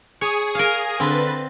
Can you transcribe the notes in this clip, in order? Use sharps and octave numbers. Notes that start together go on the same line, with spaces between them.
G#4 C#5 G#5 D#6
A#4 F5
D3 C4 B4 A6